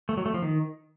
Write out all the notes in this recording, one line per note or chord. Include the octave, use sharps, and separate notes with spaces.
A3
F#3
A3
F3
D#3